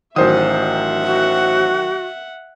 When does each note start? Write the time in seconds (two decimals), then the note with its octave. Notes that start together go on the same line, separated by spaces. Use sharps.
0.16 A1 D#3 F#3 C5 E5 F#5 D#6
1.04 F#4